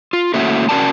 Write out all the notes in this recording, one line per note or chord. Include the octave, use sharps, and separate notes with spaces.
F4
A3 A#3 C#4 E4 F#4 E5
C#4 F#4 A#4 D5 A5